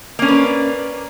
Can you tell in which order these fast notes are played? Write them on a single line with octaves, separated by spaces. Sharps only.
A#3 C#4 D4 B4